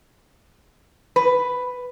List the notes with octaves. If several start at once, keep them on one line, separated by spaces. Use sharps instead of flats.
B4